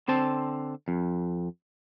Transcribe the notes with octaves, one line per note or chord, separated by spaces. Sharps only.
D3 C4 C5 A5
F2